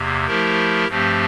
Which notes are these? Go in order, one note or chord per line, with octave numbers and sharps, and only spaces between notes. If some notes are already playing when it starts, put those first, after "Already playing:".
Already playing: E2 C3 A#3
F3 A3 E4 G4 A#4
G2 F3 A3 C4 G4